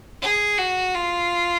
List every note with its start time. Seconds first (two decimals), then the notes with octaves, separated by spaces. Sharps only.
0.22 G#4
0.58 F#4
0.95 F4